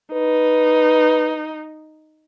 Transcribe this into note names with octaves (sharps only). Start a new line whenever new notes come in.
D#4 B4